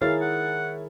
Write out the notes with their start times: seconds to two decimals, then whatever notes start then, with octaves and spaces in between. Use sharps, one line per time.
0.01 D#3 E4 G#4 A#4 C#5 F5 A6
0.21 F#5